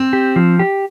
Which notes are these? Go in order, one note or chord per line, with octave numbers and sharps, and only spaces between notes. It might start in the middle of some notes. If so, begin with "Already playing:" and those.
Already playing: C4
G4
F3
G4